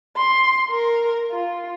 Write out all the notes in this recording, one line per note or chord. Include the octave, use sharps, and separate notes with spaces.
C6
A#4
F4